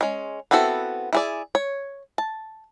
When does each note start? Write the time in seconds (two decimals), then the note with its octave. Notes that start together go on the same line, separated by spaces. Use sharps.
0.01 G#3 C#4
0.51 B3 C4 E4 F#4 A4
1.13 E4 G#4 D5
1.55 C#5
2.18 A5